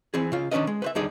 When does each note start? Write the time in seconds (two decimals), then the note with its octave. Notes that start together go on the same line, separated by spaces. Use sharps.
0.14 E3 C4 G#4
0.32 C#3 F4
0.51 D#3 C#4 D4 B4 D#5
0.67 G#3
0.82 B4 C5 E5
0.95 D#2 D3 G3 D#4 G#4 D5